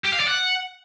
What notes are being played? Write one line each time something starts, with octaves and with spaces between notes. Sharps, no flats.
G4
F5
D5
F#5